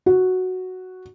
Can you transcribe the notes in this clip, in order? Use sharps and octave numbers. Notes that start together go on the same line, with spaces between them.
F#4